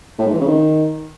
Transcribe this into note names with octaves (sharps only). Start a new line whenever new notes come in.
A2
G#2
E3
C#3
D#3